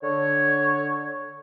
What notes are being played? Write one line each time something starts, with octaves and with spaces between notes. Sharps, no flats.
D3 C#5